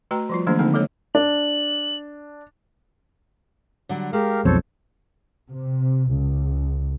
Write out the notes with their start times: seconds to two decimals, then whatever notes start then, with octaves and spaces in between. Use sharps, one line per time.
0.11 A3 F#4 B4 G5 A#5
0.29 F3 G3 F4
0.47 D#3 F3 F#3 A3 A#3 D4
0.59 D3 A3 A#3 C4 D#4
0.74 G#3 A#3 A4 C#5 D#5
1.15 D4 F#7
3.89 D3 F#3 G3
4.13 G#3 G4 A#4 F5
4.45 B1 F2 A4 C5 C#5
5.49 C3
6.11 C#2